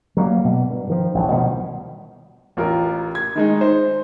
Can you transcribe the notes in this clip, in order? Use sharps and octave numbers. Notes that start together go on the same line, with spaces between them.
F#3 G3 A3 A#3
B2
G2
D#3 F3
A1 D2
B2 D#3 F3 G3
A1 F4 A#4
G#6
D#3 G#3 D#4
C5